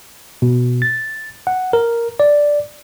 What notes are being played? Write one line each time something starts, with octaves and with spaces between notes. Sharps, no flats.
B2
A6
F#5
A#4
D5